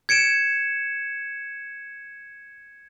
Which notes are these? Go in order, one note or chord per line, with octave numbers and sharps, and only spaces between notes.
G#6 C#7 D7 E7